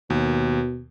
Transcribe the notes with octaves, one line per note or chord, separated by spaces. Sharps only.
D#2 B2